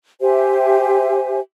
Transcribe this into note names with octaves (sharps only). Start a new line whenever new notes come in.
G4 C5 E5 G#5